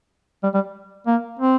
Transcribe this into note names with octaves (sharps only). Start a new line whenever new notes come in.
G3
G3
A#3
C4